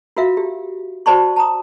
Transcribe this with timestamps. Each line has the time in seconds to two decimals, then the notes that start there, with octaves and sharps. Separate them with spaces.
0.16 F4 F#4 A#4 E5 F5
0.37 G4
1.06 F#4 C5 D5 A5 B5 C#6
1.36 A5 A#5 D#6